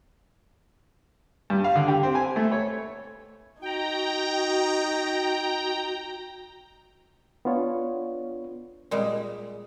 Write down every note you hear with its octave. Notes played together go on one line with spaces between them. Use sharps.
G2
F5
D3
G4
C4
G#5
A3
C#5
D#4 F#4 G5 A#5
B3 D4 F4 C#5
A#2 G3 G#3